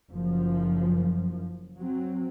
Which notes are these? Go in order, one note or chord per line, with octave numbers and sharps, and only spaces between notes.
F#1 F#2 F3
F#3 C4